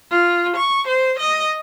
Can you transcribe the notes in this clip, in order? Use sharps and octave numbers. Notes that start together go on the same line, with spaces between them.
F4
C#6
C5
D#5